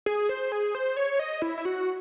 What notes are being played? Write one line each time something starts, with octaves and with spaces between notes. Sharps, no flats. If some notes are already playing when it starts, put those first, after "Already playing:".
G#4
C5
G#4
C5
C#5
D#5
E4
E4
F#4